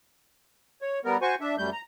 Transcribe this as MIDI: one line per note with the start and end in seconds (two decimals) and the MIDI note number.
0.82 0.99 73
1.05 1.17 55
1.05 1.17 59
1.05 1.17 70
1.22 1.35 66
1.22 1.35 72
1.22 1.35 80
1.22 1.35 85
1.41 1.56 62
1.41 1.56 76
1.58 1.70 42
1.58 1.70 55
1.58 1.70 57
1.58 1.70 91
1.72 1.81 82